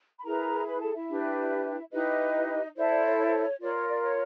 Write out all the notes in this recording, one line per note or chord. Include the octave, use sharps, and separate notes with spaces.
B5
E4 G#4 A#4 B4 A#5
B4 B5
A4 A5
E4 E5
D4 G4 B4
D#4 E4 G4 B4 D#5
E4 A4 C5 D5
D5
C#5
C#5
F4 A#4 C#5 D5
C#5
D5
C#5